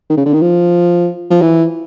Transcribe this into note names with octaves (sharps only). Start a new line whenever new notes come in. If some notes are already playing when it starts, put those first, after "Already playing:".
D#3
C#3
D3
D#3
F3
F3
E3